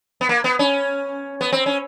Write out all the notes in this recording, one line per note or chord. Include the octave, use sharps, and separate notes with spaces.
B3
A#3
B3
C#4
B3
C4
C#4